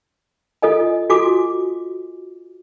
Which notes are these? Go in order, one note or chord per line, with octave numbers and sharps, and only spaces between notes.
F4 A4 D#5 G#5
F4 F#4 A4 G#5 D6